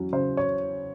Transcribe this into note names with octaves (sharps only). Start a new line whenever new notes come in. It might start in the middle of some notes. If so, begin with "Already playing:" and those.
Already playing: F#3 C#4
C#3 C5
C#5